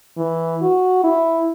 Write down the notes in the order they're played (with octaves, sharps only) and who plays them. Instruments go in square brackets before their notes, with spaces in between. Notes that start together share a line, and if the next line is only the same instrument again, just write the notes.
[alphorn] E3
F#4
E4